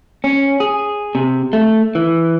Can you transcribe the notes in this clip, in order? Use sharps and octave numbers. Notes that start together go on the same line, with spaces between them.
C#4
G#4
C3
A3
E3